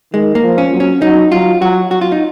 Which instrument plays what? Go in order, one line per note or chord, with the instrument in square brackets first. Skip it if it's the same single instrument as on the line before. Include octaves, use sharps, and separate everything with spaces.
[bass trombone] D#3 [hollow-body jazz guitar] G#3
[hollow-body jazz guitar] A#3
[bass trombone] F3
[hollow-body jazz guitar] C#4
[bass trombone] F#3
[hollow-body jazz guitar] C#4
[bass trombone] F#3 [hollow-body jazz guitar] D#4
[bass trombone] F#3 [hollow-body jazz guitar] F4
[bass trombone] F#3 [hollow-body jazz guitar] F#4
[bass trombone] F#3 [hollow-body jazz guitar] F#4
[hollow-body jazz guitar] F4
D#4